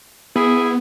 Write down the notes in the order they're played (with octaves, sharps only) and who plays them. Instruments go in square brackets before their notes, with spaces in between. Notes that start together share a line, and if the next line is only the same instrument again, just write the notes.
[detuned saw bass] B3 [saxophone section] E4 G#4